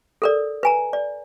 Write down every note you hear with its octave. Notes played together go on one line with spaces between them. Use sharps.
A4 A#4 D5
B4 G#5 A#5
D5